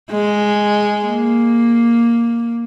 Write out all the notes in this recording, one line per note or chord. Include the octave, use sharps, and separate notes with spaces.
G#3
A#3